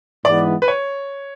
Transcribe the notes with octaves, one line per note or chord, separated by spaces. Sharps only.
G#2 E3 G#3 B3 D5
B4
C#5